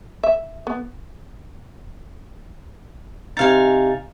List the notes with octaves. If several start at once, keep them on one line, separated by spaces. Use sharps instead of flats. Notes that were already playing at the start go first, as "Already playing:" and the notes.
E5
B3
C3 D#4 F5 G#5 A6